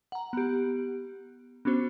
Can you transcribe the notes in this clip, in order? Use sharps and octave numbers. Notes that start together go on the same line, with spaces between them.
F#5 A#5
B3 G4
B3 C#4 D4 F#4 C5